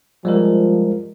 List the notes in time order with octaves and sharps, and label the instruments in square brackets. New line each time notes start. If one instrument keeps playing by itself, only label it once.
[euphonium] F3 [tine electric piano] G3 G#3 A#4